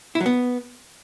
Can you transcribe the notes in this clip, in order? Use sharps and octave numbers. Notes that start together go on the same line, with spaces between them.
E4
F#3
B3